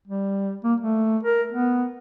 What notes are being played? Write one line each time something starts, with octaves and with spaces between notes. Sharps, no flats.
G3
A#3
A3
A#4
B3